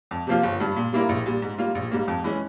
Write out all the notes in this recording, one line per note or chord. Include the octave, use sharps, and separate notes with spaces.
F2
C3 F3 A#3 F4
G1
G2 G3
A#2
G3 A#3 E4 A#4
A#1
A#2 G3
G#2
G3 A#3 F4
A#1
G#2 G3 A#3
F2
E3 G#3 C#4